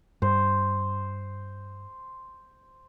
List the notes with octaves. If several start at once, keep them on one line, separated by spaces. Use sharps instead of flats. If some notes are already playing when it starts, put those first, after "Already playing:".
G2 C5